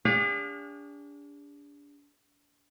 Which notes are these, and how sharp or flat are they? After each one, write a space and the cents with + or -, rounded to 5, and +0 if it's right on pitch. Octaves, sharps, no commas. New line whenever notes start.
D4 -30 G#4 -45 F5 +45